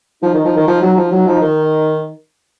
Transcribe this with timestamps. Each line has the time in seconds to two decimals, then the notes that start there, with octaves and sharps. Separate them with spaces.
0.23 F3 D#4
0.34 D#3
0.45 F3
0.56 D#3
0.68 F3
0.82 F#3
0.97 F3
1.12 F#3 D#4
1.27 F3
1.42 D#3